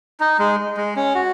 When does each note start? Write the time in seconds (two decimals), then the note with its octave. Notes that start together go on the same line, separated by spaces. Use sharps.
0.20 D#4
0.39 G#3
0.77 G#3
0.96 C#4
1.15 F#4